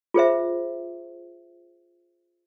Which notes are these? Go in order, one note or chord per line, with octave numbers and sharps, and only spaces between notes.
F4 G#4 C5 E5